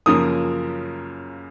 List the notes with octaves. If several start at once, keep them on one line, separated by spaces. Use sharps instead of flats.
F#2 C#3 F3 A#3 D#6